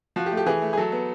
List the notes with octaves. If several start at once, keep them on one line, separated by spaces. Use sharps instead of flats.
F3 F#4
G4
A3
G4
E3 G#4
A3
G#4
F#3 A4
B3